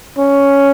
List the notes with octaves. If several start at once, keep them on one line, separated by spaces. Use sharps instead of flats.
C#4